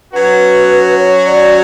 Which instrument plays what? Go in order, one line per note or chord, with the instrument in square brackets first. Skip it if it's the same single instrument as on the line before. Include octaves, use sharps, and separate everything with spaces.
[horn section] F#3 C#4 F#4 [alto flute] B4
[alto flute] C#5
D5